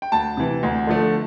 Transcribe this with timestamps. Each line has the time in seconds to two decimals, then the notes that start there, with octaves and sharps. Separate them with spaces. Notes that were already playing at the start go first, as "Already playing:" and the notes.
0.02 G5
0.12 D2 A5
0.37 C3 E3
0.63 D2
0.87 D3 F3 A3